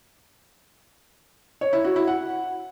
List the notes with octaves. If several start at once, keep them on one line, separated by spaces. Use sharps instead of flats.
C#5
E4
F#4
E4
F#5